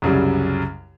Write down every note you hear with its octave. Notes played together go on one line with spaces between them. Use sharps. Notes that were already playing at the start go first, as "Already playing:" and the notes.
C2 F#2 C#3 G3